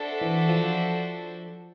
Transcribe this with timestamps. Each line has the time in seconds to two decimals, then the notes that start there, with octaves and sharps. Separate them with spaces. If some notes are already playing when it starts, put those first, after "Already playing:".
Already playing: D4 F#4 A4 C5 E5
0.21 E3
0.49 F3